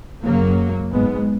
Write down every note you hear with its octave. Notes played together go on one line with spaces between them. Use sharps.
F#1 F#2 C#3 F#3 A#3
G#1 G#2 G#3 B3